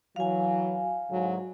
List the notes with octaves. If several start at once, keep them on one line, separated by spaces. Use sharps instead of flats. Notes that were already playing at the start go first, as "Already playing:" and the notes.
E3 F#3 F5 G#5
G#2 D3 F#3